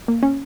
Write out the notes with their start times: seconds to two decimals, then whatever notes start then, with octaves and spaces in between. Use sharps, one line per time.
0.08 A#3
0.23 C#4